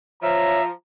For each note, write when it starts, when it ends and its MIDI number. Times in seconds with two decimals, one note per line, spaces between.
0.22 0.72 53
0.22 0.60 73
0.22 0.63 76
0.22 0.73 82